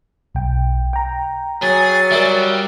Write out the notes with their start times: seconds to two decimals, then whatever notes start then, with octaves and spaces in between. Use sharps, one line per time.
0.35 B1 G5
0.93 G5 A#5
1.62 F#3 G#4 A6
2.12 G3 A#4 E5